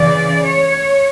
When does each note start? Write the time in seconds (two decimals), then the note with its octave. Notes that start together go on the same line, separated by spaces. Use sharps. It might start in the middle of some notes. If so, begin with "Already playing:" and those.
Already playing: C#3 E3 D5
0.43 C#5